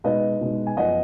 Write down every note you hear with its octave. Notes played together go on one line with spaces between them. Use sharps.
B2 G#3 D#4 B4 D#5
B2 G#3 D#4
G#5
F#2 F3 B3 D#5 F#5